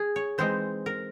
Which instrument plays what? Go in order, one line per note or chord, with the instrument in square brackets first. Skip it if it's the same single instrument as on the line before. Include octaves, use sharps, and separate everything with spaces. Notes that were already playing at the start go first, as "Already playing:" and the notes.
Already playing: [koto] G#4
C#5
E3 G#3 C4 D#4 C5
A#4